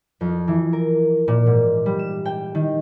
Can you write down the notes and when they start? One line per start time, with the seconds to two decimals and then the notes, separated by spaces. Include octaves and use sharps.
0.21 F2
0.48 E3
0.73 A#4
1.28 A#2
1.46 G#2
1.86 G3
1.99 E7
2.25 G5
2.55 D#3